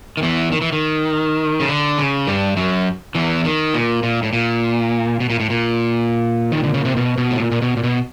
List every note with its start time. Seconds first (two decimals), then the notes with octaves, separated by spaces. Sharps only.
0.17 D#3
0.22 E2 E3
0.52 D#3
0.61 E3
0.72 D#3
1.60 C#3
1.69 D3
1.98 C#3
2.27 G2 G3
2.57 F#2 F#3
3.15 E2 E3
3.45 D#3
3.74 A#2
4.03 A#2
4.23 A2
4.33 A#2
5.20 B2
5.30 A#2
5.40 A2
5.50 A#2
6.52 D#3
6.64 D3
6.74 C#3
6.85 C3
6.97 B2
7.18 B2
7.31 A2
7.40 A#2
7.52 A#2
7.62 B2
7.77 A#2
7.84 B2